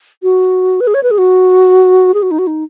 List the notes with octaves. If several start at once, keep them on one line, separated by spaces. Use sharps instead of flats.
F#4
B4
G#4
C#5
B4
G#4
F#4
G#4
F#4
D#4
F#4
D#4